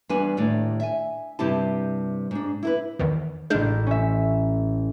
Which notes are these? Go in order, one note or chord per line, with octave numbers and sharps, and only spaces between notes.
E2 G3 D4 B4 G#5
D#2 A2 D5
E5 G#5
G2 C3 C4 E4 G4 A5
G#2 D4
E4 A#4 B4
E2 D#3 E3
A1 G#3 D4 G#4 F6 G6
C#4 E5